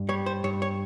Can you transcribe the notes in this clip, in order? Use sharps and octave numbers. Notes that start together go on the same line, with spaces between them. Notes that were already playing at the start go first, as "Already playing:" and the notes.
Already playing: G2
G3 C#5
C5
G2 C#5
C#5